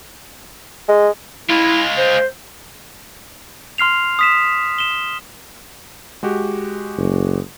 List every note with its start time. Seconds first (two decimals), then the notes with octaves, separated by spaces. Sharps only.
0.88 G#3
1.49 G#3 E4 F4
1.98 C5
3.78 C6 F6 C7 F7
4.19 D#6 B6 E7
4.78 E7 G7
6.23 G#3 F#4 G4
6.98 F#1